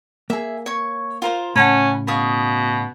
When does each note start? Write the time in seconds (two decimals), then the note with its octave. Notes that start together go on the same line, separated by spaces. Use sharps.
0.30 A#3 G#4 E5
0.66 C#5 C#6
1.22 F4 A#4 C5
1.56 A2 C#3 C#4 F#5 A5 B5
2.07 B2 F5 C#6 D#6